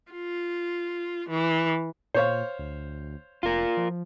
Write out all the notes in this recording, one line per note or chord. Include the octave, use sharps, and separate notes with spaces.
F4
E3
A#2 C5 C#5 F5
D2
F1 F4 A#4
F3